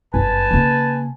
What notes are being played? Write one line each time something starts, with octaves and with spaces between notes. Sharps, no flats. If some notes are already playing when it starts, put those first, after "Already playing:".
G1 F#2 B4 G#5 A5
C#3 A#3